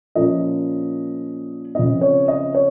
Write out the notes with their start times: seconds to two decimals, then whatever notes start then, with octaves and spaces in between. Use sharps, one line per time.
0.15 A#2 F3 A#3 C#4 D#5
1.75 C#3 F3 C4 D#5
2.01 C#5
2.28 D#5
2.55 C#5